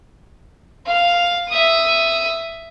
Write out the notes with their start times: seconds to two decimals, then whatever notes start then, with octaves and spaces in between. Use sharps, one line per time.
0.87 F5
1.49 E5 D#6